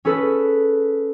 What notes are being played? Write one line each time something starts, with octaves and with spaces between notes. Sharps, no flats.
C#4 G#4 A4 B4